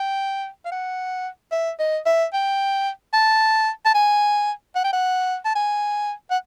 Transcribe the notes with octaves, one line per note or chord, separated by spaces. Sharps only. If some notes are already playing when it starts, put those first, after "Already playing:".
Already playing: G5
F5
F#5
E5
D#5
E5
G5
A5
A5
G#5
F#5
G5
F#5
A5
G#5
F#5